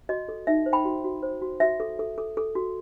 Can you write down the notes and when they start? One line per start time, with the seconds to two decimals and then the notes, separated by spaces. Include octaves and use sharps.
0.09 F#4 D#5
0.29 A4
0.47 D#4 E5
0.66 C5
0.73 G5 B5
0.85 F#4
1.04 F#4
1.23 C5
1.42 F#4
1.60 F#4 E5
1.80 A4
1.99 A4
2.18 A4
2.37 A4
2.55 F#4